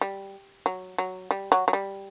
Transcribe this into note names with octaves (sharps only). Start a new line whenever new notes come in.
G3
F#3
F#3
G3
F#3
F#3
G3